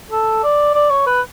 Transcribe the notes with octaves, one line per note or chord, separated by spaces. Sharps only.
A4
D5
D5
C#5
B4